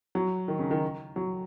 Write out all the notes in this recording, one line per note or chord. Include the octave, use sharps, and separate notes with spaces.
F#3
D#3
C#3
D#3
F#3